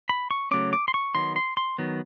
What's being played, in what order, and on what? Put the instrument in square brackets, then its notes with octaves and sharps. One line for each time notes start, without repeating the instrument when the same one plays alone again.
[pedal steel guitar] B5
C#6
C#3 F#3 A3 C#4 D6
D6
C6
C#6
D#3 F#3 B3 C6
C6
C6
D#3 F#3 B3